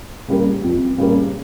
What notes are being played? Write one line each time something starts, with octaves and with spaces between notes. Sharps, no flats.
C#3 G3 A#3
F2
C#3 G3 A#3